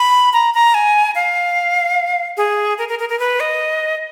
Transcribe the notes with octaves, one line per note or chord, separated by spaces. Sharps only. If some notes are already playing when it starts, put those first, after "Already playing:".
Already playing: B5
A#5
A#5
G#5
F5
G#4
A#4
A#4
A#4
A#4
B4
D#5